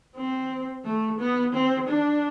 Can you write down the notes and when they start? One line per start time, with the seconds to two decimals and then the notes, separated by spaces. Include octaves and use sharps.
0.16 C4
0.85 A3
1.19 B3
1.53 C4
1.88 D4